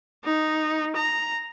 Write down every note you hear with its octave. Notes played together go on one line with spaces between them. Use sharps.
D#4
A#5